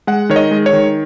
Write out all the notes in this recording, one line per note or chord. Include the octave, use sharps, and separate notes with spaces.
G#3 F#5
D#3 C#5
D#5
G#3
C#5
D#3